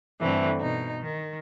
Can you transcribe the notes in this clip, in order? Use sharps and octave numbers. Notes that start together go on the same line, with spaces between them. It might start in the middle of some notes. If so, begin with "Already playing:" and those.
G2 D3 E3 A3 C4
B2 D#4
D#3